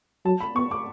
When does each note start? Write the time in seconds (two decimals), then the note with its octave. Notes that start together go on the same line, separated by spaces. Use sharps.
0.25 F#3 A5
0.40 B5
0.55 B3 C#6
0.71 D6